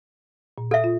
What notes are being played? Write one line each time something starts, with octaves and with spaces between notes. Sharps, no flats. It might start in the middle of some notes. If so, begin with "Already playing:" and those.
A#2
A4 E5
F4